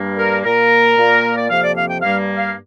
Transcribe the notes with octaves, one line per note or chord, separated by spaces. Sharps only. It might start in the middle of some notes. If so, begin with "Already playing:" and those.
Already playing: G2 G3 A#3
A#4
A#2 A#3 A#4
A#2 A#3
D5
F2 C3 F3 A#3 F5
D5
F5
G5
G2 G3 A#3 F5
F5